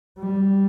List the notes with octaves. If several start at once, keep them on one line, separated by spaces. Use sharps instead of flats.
G3